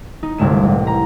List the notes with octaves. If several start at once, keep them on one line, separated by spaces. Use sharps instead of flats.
D#4
G1 C2 G2 G#3 A3 E7
A1
A#5